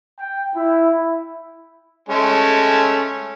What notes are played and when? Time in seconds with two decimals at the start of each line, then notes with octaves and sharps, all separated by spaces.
0.19 G5
0.56 E4
2.09 G#3 A3 C#4